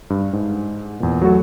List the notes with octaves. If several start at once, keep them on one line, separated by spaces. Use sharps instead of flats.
G2
G#2
E2 A#2
F#3 A3 F#4 A4